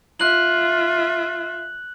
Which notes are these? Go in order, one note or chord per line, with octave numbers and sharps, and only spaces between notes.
F4 E5 F#6 F#7